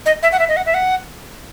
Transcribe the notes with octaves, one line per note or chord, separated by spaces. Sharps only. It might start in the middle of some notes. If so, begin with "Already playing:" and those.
D#5
E5
F#5
E5
D#5
F#5
E5
F#5